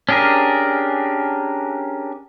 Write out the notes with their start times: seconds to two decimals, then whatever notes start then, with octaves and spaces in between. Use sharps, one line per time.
0.09 C#4 D4 G4 G#4 A#4